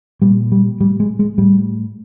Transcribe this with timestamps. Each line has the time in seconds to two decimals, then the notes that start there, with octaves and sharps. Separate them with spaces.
0.22 A#2 G3
0.52 G3
0.80 A2 G3
1.00 G#3
1.19 G#3
1.38 A2 G3